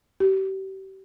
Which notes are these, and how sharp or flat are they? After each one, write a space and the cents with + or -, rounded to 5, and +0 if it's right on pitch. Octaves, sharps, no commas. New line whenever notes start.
G4 -35